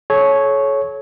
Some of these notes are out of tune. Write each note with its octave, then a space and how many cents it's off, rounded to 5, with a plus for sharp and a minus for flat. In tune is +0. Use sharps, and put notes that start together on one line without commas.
A4 -40 C#5 +0